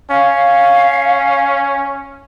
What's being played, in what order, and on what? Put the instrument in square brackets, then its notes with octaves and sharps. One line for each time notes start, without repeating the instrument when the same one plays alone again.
[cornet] C#4 [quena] F5